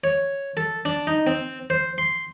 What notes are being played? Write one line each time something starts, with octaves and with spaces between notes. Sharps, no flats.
C#5
A4
D4
D#4
C4
C5
C6